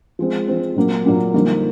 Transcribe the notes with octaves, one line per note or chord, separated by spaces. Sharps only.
F3 G#3 C4
F3 G#3 C4
A#2 F#3 A#3
A#2 F#3 A#3
F2 D3 G3 A#3 D#4